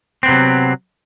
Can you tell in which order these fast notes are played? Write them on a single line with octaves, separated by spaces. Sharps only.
C4 B3 C3 F#3